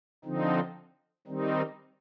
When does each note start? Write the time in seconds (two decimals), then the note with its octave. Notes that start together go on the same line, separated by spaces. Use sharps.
0.25 D3 F3 C4 D#4
1.27 D#3 G3 C4 D#4